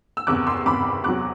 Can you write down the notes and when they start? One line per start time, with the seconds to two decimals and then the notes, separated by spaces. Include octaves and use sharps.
0.17 E6
0.27 F#1 E2 C3 D6 F#6
0.47 C6 E6
0.66 F#1 E2 C3 B5 D6
1.04 E2 C3 F#3 D6 F#6